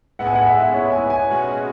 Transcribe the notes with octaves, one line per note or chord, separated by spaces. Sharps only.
A2 G#3 B3 E4 F#5
G#5
F#5
E5
C#5
G#5
G#5
B2 G#3 C#4 F#4